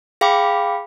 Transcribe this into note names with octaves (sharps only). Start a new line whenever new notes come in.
G#4 F5 G5 B5 D6